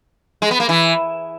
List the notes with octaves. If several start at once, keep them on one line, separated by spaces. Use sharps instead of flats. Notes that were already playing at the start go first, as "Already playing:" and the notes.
G#3
B3
A#3
E3